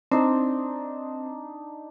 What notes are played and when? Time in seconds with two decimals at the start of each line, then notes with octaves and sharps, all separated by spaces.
0.12 C4 D4 D#4 D5